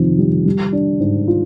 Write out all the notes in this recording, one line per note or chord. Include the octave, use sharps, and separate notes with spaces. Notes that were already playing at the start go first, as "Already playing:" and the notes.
Already playing: F2 C3 D#3
G3
G3
D4
G#2
F4